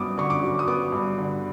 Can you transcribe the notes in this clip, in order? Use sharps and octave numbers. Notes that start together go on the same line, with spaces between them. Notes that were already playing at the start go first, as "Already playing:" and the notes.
Already playing: G2 F#3 B3 D6 D#6
D3 C#6
D6
F#3
D#6
B3 D6
G2
D3